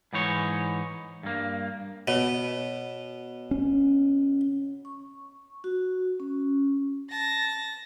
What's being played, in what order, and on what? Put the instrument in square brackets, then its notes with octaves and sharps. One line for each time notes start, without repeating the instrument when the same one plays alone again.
[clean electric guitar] G#2 E3 D#4 C#5
G2 A#3
[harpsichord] B2 [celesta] C#5
[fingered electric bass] C#4
[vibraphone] C#6
F#4
C#4
[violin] A5 A#6